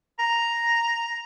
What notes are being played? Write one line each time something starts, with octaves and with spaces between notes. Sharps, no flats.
A#5